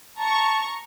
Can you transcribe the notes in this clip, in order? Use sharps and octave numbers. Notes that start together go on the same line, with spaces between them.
A5 A#5 C#6